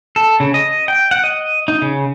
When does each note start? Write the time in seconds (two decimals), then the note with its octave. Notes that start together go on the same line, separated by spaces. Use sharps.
0.16 A4
0.40 C#3
0.54 D#5
0.88 G5
1.11 F#5
1.24 D#5
1.68 D#4
1.82 C#3